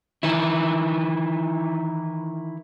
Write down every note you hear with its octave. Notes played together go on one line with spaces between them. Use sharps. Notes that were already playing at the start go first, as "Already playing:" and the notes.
D#3 E3 E4